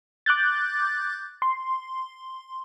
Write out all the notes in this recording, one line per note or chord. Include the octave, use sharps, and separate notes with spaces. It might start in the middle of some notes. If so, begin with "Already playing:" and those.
D6 F#6 G6 A6
C6